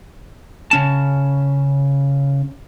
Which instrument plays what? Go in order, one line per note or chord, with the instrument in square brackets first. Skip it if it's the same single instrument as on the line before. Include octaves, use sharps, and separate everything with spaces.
[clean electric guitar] C#3 C#4 A5